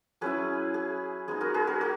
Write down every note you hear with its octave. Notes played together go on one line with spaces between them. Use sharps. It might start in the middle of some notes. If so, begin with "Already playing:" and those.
F#3 C#4 E4 G#4 B4
G#4
G#3 B3 D#4 G#4
F#4 A#4
G#4 B4
F#4 A#4
F#4 A#4